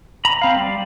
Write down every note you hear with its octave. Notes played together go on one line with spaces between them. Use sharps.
A#5 B5
C4 F5
G3